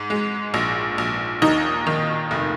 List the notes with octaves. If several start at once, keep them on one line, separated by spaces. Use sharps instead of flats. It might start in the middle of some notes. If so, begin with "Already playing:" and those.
Already playing: G#2
G#3
A#1
A#1
D#2 D#4
D#3
F1